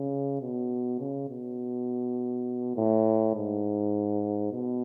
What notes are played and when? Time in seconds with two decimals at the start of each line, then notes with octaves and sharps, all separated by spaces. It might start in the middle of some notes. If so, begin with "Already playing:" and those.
Already playing: C#3
0.41 B2
1.00 C#3
1.29 B2
2.76 A2
3.35 G#2
4.52 B2